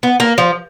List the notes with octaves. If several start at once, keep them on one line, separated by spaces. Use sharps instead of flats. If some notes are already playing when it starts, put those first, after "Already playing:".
B3
A#3
F3